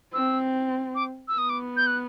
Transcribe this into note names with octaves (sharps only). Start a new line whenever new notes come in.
C4 E6
D6
E6
B3 D#6
D6
G6
F#6